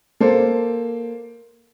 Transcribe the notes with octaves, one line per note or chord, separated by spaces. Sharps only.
A#3 A4 C5